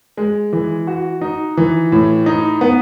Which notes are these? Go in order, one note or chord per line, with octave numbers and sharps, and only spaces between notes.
G#3
E3
F#4
D#4
E3
A2
D#4
B3